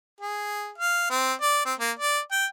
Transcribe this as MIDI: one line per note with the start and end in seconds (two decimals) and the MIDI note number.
0.21 0.71 68
0.78 1.08 77
1.10 1.33 60
1.41 1.62 74
1.65 1.74 60
1.79 1.91 58
1.99 2.19 74
2.31 2.45 79